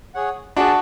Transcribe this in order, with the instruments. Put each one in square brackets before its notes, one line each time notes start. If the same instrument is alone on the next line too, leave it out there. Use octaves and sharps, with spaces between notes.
[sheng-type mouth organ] G#4 C#5 F#5
[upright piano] D4 F#4 [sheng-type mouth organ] G#4 D5 A5